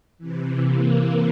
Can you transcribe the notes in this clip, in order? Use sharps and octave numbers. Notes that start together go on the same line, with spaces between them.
C3 E3
A#3